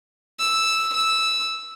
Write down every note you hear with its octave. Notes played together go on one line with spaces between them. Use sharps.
E6
E6